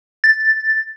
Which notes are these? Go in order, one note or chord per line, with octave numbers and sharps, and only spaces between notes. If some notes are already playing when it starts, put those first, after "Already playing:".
A6